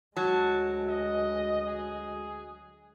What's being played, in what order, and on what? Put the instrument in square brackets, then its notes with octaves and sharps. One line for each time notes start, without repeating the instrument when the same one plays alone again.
[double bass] D2 G#3 [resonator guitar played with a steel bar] F#3 [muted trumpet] A5
[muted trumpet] D#5
G#4